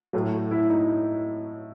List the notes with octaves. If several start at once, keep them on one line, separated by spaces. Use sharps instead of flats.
A2 F#3 A3
E4
D#4